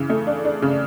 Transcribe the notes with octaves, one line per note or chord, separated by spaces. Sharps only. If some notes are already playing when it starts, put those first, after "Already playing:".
Already playing: C#3 E3
A3
D4
D4
C#3